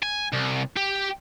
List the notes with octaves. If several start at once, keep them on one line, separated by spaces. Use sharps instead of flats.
G#5
C2
G4